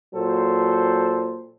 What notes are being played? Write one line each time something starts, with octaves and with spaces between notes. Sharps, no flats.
A#2 F#3 A4 C5